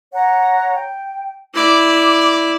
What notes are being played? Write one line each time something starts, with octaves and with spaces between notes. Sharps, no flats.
C#5 F#5 A#5
G5
E4 D5 D6